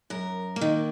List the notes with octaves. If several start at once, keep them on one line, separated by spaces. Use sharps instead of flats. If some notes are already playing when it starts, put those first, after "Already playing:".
F#2 A#4
A#3
D#3